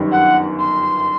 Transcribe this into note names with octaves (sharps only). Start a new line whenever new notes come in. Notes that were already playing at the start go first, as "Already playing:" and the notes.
Already playing: G1 F#2 D#3 G3
F#5
C6